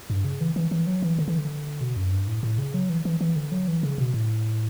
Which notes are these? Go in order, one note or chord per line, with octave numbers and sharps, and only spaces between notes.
G2
C#3
E3
E3
E3
F#3
E3
D3
E3
D3
B2
F#2
G2
A2
A2
C#3
F#3
E3
E3
E3
D3
F#3
E3
C#3
B2
A2